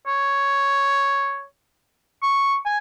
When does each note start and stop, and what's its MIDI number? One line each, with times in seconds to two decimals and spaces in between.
0.07 1.44 73
2.22 2.56 85
2.66 2.78 80